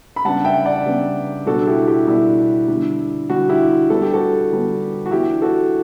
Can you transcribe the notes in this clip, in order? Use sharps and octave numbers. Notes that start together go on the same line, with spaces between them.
B5
C#3 G3 B3 D4 F#5 A5
E5 G5
D5 F#5
C#3 G3 B3 D4
B2 G3 D4 F#4 A4
E4 G4
E4 G4
B2 G3 D4 E4
D3 G3 D4
D3 G3 D4 F#4
E4 G4
D3 G3 B3 A4
G4
F#4 A4
D3 G3 B3
F#4
E3 B3 D4 E4 G4
F#4 A4